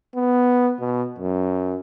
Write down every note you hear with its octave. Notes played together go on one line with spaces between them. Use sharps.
B3
B2
F#2